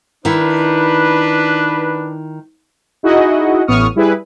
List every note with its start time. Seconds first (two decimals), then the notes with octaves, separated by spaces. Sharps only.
0.25 D#3 D4 E4 B4
3.03 D#4 E4 F#4 G#4 D#5 F#5
3.67 A1 A2 B3 C#6 D#6 F6
3.96 G3 E4 G#4 B4